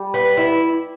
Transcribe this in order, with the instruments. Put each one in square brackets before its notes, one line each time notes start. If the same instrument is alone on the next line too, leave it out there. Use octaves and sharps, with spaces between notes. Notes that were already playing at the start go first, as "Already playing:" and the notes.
Already playing: [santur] G3
[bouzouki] B3
E4